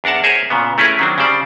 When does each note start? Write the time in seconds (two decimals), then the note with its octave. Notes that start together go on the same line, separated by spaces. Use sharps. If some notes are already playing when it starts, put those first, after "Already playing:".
0.04 E2 D4 A#4 F#5 A5
0.24 G#4 A#4 C5 C#5 E5 G#5
0.50 A#2 C#3 B3
0.78 A3 C#4 E4 G#4 A#4 B4
0.99 D#3 F#3 C4 D4
1.18 C#3 G3 C5 D5